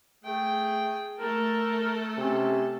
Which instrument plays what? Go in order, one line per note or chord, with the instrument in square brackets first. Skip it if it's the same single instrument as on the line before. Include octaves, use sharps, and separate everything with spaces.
[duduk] A3 [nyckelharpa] G#4 G5
[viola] A3 A4 [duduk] A#4 [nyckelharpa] A5
[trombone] C3 [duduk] C#4